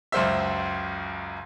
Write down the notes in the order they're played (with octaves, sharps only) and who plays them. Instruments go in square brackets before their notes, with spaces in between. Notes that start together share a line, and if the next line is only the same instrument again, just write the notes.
[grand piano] C#2 F#2 C5 E5